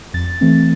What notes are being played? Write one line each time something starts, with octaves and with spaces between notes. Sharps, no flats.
F2 A6
E3 A3 C4